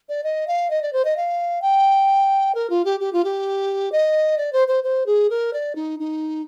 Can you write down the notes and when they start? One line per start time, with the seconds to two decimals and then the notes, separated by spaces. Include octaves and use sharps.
0.09 D5
0.24 D#5
0.47 F5
0.70 D#5
0.82 D5
0.93 C5
1.05 D#5
1.17 F5
1.62 G5
2.55 A#4
2.70 F4
2.85 G4
3.00 G4
3.13 F4
3.24 G4
3.92 D#5
4.38 D5
4.53 C5
4.68 C5
4.84 C5
5.06 G#4
5.30 A#4
5.53 D5
5.76 D#4
5.99 D#4